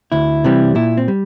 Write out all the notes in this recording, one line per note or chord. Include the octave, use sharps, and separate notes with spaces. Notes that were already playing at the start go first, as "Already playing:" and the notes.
D2 E4
C3 E3 G3 C4
A#2 E4
C4
G3